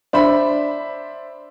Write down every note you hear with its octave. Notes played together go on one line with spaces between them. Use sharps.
D4 C5 E5 B5